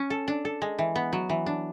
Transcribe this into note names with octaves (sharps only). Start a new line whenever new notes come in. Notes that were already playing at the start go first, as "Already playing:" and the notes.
Already playing: C#4
A4
D4
A4
G#3
E3
B3
F#3
E3
D4